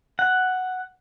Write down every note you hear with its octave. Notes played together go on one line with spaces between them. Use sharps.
F#5